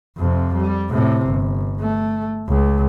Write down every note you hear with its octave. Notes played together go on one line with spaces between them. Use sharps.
F2 C3
G3
A2 C3
G1
A3
C#2